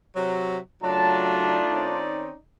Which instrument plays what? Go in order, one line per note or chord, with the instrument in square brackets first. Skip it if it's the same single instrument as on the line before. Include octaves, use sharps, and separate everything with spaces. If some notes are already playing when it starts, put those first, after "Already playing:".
[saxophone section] C3 F#3
[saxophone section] C#3 F#3 [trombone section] A3 D4 F4 [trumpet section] A5
[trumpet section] D#4 D5
[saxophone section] D#3 C4 C#4